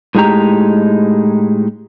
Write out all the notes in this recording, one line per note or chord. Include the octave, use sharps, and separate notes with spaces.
A2 G#3 D#4 G4 A#5